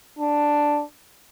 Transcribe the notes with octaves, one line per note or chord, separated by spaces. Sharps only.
D4